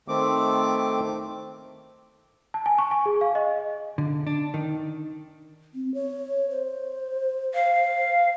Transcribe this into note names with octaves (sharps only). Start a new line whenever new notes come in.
D#3 A3 C4 D6
A5
G#5
C#6
G#5
G#4
F5
D#5
D3
D4
D#3
C4
C#5
C5
F5